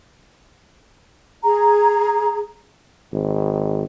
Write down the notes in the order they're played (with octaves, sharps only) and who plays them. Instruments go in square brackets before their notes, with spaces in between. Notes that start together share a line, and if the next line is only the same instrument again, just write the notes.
[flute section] G#4 A#5
[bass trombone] G#1